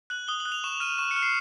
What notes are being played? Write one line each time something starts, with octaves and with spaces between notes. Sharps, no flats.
F#6 F#7
D#6 G7
F#7
F#6
F7
C#6 E7
F6 D#7
C#6 E7
C#7
F6
C7